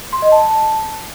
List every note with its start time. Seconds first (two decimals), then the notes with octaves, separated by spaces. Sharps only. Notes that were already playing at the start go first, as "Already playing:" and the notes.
0.13 C6
0.22 D#5
0.32 A5